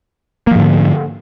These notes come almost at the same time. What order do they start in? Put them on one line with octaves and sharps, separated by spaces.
A#3 F3 G#2 D3